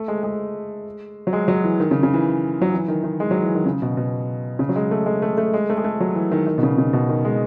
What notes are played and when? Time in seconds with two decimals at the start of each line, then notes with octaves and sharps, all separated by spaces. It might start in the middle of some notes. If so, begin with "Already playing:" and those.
Already playing: A3
0.08 G#3
0.23 G#3
1.27 F#3
1.33 G#3
1.48 F#3
1.64 E3
1.80 D#3
1.91 C#3
2.03 C#3
2.14 E3
2.62 F#3
2.73 E3
2.88 D#3
3.04 D#3
3.20 G#3
3.31 F#3
3.42 E3
3.55 D#3
3.66 C#3
3.82 B2
3.97 B2
4.59 C#3
4.69 F#3
4.76 G#3
4.91 A3
5.06 G#3
5.22 A3
5.38 A3
5.54 G#3
5.69 A3
5.77 G#3
5.84 A3
6.00 F#3
6.15 E3
6.31 D#3
6.46 D#3
6.58 B2
6.63 C#3
6.78 C#3
6.93 B2
7.09 D#3
7.25 G#3